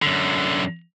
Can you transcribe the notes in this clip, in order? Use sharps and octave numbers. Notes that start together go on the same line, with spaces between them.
F#2 D3